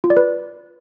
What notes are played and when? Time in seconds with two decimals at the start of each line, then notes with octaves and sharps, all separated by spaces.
0.04 F4
0.10 D5
0.17 B4